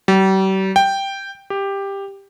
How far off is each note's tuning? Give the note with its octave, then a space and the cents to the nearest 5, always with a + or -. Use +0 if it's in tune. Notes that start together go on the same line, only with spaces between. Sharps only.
G3 -40
G5 +0
G4 +10